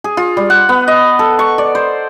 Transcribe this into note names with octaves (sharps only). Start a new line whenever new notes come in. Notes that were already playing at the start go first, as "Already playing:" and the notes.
G#4
F4
G3
F#5
B3
D#5
A4
C#6
D5
C5